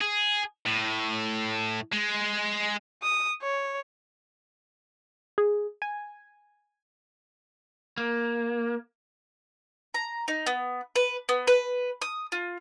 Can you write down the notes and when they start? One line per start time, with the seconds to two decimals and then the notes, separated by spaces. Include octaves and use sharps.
0.01 G#4
0.66 A2
1.92 G#3
3.02 D#6
3.43 C#5
5.38 G#4
5.82 G#5
7.98 A#3
9.94 A#5
10.28 D#4
10.47 B3
10.96 B4
11.29 B3
11.47 B4
12.02 D#6
12.32 F4